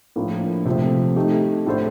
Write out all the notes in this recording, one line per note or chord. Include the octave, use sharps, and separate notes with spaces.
A2 F3 A#3 D4
C3 F3 A3 C4
A3 D#4 G4
A2 A3 D4 A4 C5